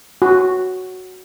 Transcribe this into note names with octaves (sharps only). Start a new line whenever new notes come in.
F#4